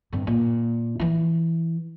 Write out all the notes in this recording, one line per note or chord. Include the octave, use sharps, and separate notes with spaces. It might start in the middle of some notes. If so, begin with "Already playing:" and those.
G2 C3
A#2
E3 E4